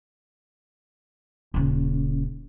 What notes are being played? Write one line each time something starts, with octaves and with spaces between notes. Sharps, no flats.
D#1 C#3